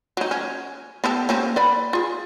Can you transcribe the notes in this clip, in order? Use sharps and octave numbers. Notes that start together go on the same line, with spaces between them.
F#3 D#4
C#4
B3 G4 A4
A#3 C4 C#4
B4 D5 B5
F4 G#4